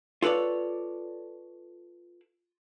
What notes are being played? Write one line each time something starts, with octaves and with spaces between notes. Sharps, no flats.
F4 A4 B4 C#5 D5